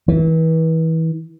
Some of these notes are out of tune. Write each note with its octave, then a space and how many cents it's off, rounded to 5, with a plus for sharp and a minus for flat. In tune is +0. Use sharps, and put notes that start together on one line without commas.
E3 -30